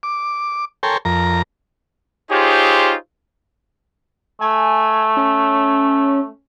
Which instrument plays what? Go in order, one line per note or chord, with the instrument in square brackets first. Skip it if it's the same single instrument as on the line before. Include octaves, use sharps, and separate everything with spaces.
[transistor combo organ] D6
A4 A#4 C#5 G5 G#5 C6
F2 A#4 A#5
[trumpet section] D#4 F4 G4 G#4 C5 C#5
[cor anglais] A3 [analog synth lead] G#5
[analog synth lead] C#4